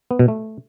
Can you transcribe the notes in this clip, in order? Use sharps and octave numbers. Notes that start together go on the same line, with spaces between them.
B3
B2
A3